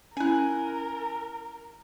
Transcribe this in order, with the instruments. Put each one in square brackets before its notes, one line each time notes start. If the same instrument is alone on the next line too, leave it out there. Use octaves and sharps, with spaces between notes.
[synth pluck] C#4 E4 [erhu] A#4 [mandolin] G#5 F#6